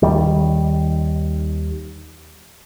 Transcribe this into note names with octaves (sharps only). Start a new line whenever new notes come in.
D#2 D#3 G3